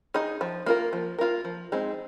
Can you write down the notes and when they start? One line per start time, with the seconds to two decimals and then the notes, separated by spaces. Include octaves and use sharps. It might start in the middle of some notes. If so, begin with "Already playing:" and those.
0.14 D#4 G#4 D#5
0.41 F3
0.66 A#3 F4 A#4
0.93 F3
1.19 A#3 F4 A#4
1.45 F3
1.72 G#3 C4 D#4 G#4